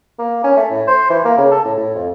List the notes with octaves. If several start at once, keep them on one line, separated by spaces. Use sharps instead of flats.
A#3
C#4
A3
A2
C5
E3
A#3
C#3
A4
A2
A2
F2